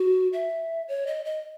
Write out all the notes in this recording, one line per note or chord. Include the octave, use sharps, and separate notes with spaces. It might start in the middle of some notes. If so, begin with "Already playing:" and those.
Already playing: F#4
E5
C#5
D#5
D#5